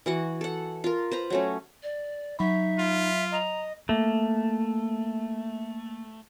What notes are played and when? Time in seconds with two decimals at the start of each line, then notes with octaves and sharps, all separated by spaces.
0.06 E3 F#4 F#5
0.41 A4 F#5
0.84 F4 A#4
1.11 B4 C5 A#5
1.30 F#3 A3 C#4
1.83 D5
2.39 F#3 D#4 E5 B5
2.79 F4
3.32 D#5 A#5
3.89 A3 A#3